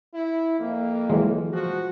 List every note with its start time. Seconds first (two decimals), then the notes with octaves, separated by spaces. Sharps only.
0.14 E4
0.60 F2 A#3
1.10 E3 F#3 G#3
1.53 F3 F#4